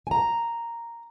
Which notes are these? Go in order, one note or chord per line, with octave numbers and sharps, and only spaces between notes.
G#5 A#5